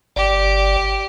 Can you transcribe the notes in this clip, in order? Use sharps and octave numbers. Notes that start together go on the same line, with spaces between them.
G1 G4 D5